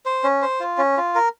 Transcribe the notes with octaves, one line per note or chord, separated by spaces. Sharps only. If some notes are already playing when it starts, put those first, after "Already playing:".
C5
C#4
C5
F4
C#4
F4
A#4